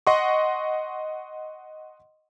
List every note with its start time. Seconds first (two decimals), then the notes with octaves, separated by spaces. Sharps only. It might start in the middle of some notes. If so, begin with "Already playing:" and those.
0.07 D#5 F#5 C6 C#6